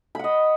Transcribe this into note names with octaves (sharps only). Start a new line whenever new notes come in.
D#5 F#5 B5